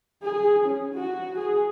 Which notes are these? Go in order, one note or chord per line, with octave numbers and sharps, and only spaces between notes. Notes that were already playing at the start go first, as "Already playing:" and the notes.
G#4
C#4
F#4
G#4